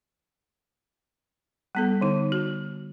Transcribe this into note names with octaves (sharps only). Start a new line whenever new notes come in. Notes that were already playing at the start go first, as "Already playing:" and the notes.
G3 B3 A4
D3 D#4
F#4